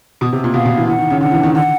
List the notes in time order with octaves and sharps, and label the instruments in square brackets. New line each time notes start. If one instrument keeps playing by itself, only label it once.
[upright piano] B2
C3
A#2
[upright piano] B2 [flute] F5
[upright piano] B2
E3
[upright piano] E3 [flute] F#5
[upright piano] D#3
C#3
[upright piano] D3 [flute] F#5
[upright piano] E3
D#3
[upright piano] D3 [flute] F#5